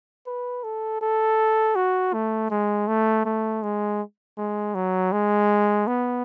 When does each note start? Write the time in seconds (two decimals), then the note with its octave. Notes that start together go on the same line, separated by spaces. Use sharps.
0.27 B4
0.64 A4
1.01 A4
1.76 F#4
2.13 A3
2.51 G#3
2.88 A3
3.25 A3
3.63 G#3
4.38 G#3
4.75 F#3
5.12 G#3
5.87 B3